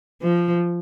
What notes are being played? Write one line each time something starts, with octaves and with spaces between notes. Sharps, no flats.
F3